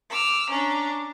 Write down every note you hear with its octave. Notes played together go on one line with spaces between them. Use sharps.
D6 E6 F6
C#4 D4 A#5